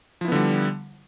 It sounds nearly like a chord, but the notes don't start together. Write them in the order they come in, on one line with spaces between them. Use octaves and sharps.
F3 E4 B3 D3 G3